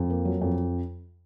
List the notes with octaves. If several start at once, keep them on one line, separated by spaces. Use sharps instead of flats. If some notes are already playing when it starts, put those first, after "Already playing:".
Already playing: F2
A#3
F#3
F2